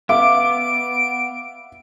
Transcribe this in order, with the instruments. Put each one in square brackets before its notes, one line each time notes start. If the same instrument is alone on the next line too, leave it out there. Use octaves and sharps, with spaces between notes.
[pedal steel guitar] B3 [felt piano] E5 F5 [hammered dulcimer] D6 [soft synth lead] D7